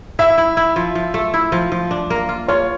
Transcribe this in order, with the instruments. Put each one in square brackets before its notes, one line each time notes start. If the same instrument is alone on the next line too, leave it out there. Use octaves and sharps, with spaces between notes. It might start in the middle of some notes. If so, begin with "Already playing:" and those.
[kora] E4 [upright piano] E5
[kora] E4
E4
F3
F3
A3
E4
F3
F3
D4
A#3
F4
[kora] F4 [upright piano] C#5